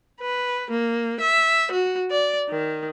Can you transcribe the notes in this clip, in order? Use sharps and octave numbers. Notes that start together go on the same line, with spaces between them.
B4
A#3
E5
F#4
D5
D#3